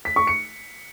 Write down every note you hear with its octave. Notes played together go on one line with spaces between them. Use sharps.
B6
C#6
C#7